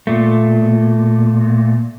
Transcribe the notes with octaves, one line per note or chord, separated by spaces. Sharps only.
A#2 A3